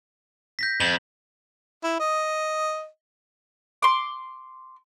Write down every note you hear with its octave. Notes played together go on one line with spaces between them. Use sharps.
G6 A#6 B6
F2 F#7
E4
D#5
C6 D6